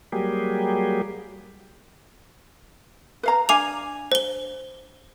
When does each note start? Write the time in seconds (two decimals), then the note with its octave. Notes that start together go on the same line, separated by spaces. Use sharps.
0.12 F#3 G3 A#3 G4 G#4
3.23 B4 F5 A#5
3.49 D4 F5 G#5 D6 F7
4.12 C5 G7